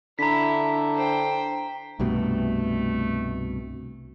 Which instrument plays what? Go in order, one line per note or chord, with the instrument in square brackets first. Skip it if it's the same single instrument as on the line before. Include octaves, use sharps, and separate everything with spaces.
[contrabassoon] D3 [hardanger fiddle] E4 E5 [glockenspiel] A#5 B6
[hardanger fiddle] C5 G5
[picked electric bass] C2 G2 B2 [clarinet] A3